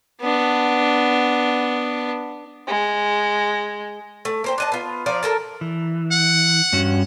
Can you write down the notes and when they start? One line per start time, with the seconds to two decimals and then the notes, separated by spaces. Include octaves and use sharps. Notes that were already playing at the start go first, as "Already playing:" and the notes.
0.21 B3 D4
2.67 G#3
4.25 A3
4.44 A#3 C5 G5
4.58 D4 D#5 A5
4.72 B3 F4
5.06 F3 A#4 D5 F5
5.23 A4 A#4 A5
5.61 E3
6.12 F#5
6.73 G2 C#4 F#4